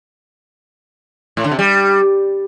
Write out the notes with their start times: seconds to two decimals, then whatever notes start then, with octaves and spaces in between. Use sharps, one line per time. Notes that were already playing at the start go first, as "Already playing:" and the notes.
1.37 A2
1.44 D3
1.51 C3
1.59 G3